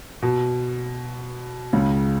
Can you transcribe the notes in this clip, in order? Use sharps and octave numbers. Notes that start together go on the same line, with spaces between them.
B2
C#2 C#3